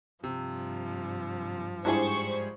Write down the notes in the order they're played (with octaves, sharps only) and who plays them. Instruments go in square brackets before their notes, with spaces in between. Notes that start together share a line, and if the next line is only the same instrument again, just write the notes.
[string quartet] G2 F3 [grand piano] C3
[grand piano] G#2 G3 G#4 [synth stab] D4 E4 F4 [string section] C5 C#6